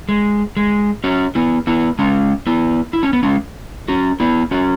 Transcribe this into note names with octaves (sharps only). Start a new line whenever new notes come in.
G#3
G#3
C#4 F#4
B3 E4
B3 E4
G#3 C#4
B3 E4
E4
C#4
B3
G#3 C#4
C#4 F#4
B3 E4
C#4 F#4